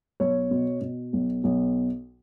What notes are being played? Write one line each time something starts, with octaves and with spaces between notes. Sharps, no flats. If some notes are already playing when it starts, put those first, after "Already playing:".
B1 C#5
B2
B2
B1
B1